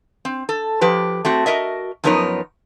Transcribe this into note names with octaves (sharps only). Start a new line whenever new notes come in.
C4
A4
F3 G4 B4
A3 C4 F#4
F#4 A#4 D#5 E5
F#2 F3 B3 D#4 A#4 C#5